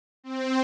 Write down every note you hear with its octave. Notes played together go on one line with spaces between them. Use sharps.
C4